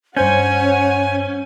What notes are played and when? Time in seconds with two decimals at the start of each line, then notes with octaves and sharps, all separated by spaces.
0.17 G2 C#4 C5 C#5 F#5 G#5 G6